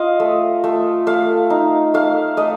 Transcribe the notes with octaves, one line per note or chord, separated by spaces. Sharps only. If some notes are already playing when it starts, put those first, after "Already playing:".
Already playing: F4 D#5 F5
A3
A3
A3 F5
D#4
A3 F5
A3 D#5